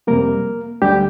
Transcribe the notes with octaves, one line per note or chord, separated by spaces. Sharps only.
F2 C3 G3 A#3 A#4
D2 D3 G3 G4